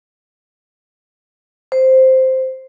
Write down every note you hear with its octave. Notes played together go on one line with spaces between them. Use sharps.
C5